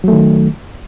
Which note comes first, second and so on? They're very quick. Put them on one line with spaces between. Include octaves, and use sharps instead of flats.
F#3 A3 D#3